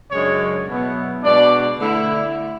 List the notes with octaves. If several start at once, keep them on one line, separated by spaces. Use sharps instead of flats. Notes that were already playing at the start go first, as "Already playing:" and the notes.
F#2 C#3 G#3 D4 C#5
B2 F#3 B3 E4
B2 G#3 D4 D5
D3 A3 E4